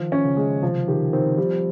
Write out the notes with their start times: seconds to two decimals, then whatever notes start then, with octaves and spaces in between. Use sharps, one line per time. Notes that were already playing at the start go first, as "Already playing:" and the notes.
Already playing: D#3 F3
0.12 C#4
0.25 C#3
0.37 G#3
0.63 C3 F3
0.88 D#3 G4
1.13 D#3 C4
1.38 F3 G3